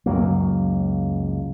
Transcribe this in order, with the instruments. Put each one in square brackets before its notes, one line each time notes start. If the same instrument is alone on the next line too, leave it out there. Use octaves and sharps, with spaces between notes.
[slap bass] C#2 F#2 F#3 A#3